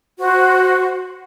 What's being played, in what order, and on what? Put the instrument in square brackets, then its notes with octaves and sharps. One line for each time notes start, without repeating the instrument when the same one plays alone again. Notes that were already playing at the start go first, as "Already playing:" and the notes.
[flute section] F#4 C5